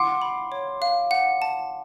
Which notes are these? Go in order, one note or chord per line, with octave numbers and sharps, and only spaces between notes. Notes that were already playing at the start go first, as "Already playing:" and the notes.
Already playing: F#5 C6 D6
B5
C#5
F5
F#5
A5